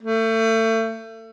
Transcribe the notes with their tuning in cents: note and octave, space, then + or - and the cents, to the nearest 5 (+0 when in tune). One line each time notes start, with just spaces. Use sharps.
A3 +30